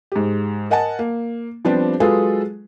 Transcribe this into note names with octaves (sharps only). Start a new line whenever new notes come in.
G#2 G4
A#4 D#5 F#5 G#5 A5
A#3
F3 G3 B3 C4 D4 G4
F#3 G#3 F4 G#4 A4 B4